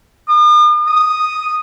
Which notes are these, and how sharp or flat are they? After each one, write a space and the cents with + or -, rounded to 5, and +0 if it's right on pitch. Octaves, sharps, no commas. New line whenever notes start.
D#6 -45
D#6 +0